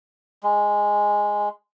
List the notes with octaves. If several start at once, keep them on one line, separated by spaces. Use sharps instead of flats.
G#3